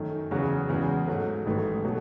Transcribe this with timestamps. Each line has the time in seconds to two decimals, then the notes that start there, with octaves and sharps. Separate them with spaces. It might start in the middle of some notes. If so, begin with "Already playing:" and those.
Already playing: F#2 D#3 A3
0.31 E2 C#3 F#3 C#4 F#4
0.69 E2 C#3 G#3
1.08 G#2 F#3 A3
1.46 A1 G#2 D#3 A3
1.84 B2 F#3 A3